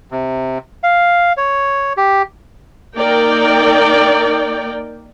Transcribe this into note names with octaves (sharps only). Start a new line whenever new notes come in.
C3
F5
C#5
G4
A#3 D#4 A#4 D5 G5